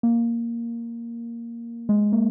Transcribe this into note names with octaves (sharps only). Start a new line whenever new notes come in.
A#3
G#3
A#3